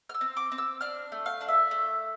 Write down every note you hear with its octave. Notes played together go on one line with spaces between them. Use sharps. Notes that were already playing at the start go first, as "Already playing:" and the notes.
F6
E6
C4
D6
C4
E6
D4 F6
A3
F5
D4
E5
A3